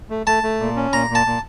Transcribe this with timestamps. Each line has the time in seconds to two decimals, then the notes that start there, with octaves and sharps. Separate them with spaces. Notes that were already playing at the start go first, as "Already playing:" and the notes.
0.10 A3
0.27 A3 A5
0.43 A3
0.61 A#2
0.76 C#4
0.93 A#2 A#5
1.10 A#2
1.15 A5
1.27 A#2